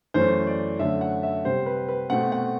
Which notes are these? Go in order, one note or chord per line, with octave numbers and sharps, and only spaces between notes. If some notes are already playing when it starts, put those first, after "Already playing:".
F#2 E3 A3 C5
D5
F#2 D3 A3 E5
F#5
E5
C3 G3 C4 C5
B4
B4
B2 A3 C4 F#5
F#5